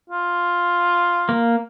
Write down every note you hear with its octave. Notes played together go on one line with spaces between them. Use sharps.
F4
A#3